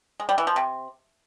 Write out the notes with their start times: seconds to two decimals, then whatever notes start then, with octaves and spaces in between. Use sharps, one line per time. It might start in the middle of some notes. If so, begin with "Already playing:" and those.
0.20 G#3
0.29 G3
0.38 E3
0.47 F3
0.56 C3